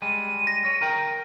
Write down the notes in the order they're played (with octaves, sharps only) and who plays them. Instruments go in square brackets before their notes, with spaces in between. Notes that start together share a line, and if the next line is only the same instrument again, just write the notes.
[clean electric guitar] G3 G#3 [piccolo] D#7
[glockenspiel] A#6
[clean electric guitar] C#5
A#4 G5 A#5